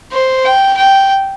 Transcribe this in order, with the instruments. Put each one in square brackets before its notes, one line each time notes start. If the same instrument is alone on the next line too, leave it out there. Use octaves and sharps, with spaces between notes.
[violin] C5
G5
G5